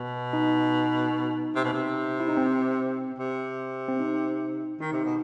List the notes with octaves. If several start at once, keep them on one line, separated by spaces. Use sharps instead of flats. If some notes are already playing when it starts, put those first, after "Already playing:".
Already playing: B2
D#4
C3
B2
C3
E4
D#4
C4
C3
C4
D#4
D#3 D#4
C3
B2